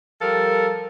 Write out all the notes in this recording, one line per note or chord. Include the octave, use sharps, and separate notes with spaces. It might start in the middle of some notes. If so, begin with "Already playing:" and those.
F3 G3 A4 A#4